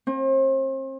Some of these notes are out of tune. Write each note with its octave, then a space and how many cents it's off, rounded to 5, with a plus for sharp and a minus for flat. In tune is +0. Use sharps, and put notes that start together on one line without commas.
C4 +40